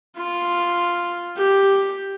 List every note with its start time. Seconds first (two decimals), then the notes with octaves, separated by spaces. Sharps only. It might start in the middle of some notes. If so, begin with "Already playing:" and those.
0.18 F4
1.37 G4